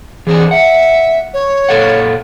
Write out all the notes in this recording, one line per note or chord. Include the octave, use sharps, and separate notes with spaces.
E3 C4 D4 G#4
E5 F#5
C#5
A#2 A4 F#5